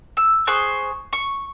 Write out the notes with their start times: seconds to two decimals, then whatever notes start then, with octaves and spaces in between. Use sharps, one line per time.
0.17 E6
0.47 G#4 C5 C#6 F#6
1.13 C#6